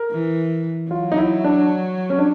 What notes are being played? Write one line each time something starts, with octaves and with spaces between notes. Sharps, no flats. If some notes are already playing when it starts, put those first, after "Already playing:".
Already playing: A#4
E3
F#3 F4
D#4
E4
D4
C#4
D4